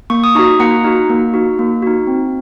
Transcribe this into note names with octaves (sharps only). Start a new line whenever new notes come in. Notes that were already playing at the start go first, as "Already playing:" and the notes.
A#3 C#6
D#6
D#4 F#4 A#5 C#6
A#3 F#5 A#5
D#4 F#4
A#3
D#4 F#4
A#3
D#4 F#4
C4